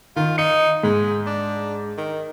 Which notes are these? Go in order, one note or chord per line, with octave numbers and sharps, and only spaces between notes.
D#3 F4
D#4 C#7
G#2 G#3
D4
D#3